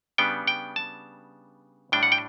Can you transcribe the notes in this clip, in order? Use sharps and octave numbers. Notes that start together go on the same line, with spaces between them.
C#3 G3 B3 D4 G5
G5
A5
A2 G3 D4 G5
F#5
G5